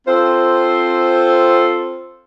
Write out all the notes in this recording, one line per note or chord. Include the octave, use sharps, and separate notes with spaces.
C4 F4 A4 C5